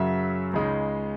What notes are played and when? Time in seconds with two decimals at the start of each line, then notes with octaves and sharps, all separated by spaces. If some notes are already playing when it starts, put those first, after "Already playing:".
Already playing: F#2 C#3 F#3 E5
0.53 C#2 C#3 G#3 D#4